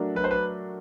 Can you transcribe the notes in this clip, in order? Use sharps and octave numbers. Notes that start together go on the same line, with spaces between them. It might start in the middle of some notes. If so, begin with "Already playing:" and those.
Already playing: F#3 A3 D4 F#4 A#4
F#3 B4
C5
B4